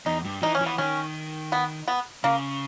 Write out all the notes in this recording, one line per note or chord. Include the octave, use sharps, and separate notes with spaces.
E2 D#4
G2
E3 D#4
C#4
E3
B3
D#3 C#4
B3
B3
C#3 A#3